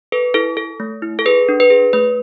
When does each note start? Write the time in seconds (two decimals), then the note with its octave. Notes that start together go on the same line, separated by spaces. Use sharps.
0.12 A4 B4
0.34 E4 A4
0.57 A4
0.80 A3
1.02 E4
1.19 A4
1.25 G#4 B4
1.49 D4
1.60 B4
1.70 G#4
1.93 A3 B4